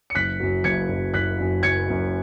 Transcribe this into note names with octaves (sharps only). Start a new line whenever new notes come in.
C#7
F#1 F#6 B6
F#2 F#3
F#1 G#6 C#7
F#2 F#3
F#1 F#6 B6
F#2 F#3
F#1 G#6 C#7
F#2 F#3